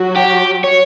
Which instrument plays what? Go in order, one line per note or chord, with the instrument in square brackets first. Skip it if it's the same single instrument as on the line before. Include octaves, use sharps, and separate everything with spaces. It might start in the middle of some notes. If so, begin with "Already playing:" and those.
Already playing: [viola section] F#3 F#4
[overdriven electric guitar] G4
C#5